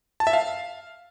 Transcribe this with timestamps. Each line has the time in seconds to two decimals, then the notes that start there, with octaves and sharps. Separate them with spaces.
0.20 A5
0.27 E5
0.33 F5